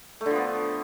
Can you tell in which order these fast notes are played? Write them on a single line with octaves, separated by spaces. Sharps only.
A3 D3 F3 B3